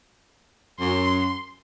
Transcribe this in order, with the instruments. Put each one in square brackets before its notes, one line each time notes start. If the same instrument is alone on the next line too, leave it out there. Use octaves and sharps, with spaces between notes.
[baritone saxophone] F#2 [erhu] C6